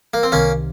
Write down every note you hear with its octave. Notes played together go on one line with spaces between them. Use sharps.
A#3
C4
C2 C3 D#3 A#3 C#4